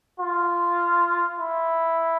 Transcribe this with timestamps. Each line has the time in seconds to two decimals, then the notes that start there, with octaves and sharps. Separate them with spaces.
0.20 F4
1.40 E4